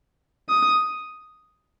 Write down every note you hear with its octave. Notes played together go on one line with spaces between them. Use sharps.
D#6